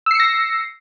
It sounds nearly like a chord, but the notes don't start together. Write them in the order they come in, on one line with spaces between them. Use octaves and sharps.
E6 C7 C#7 A#6